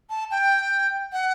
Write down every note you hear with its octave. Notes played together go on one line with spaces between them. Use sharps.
A5
G5
F#5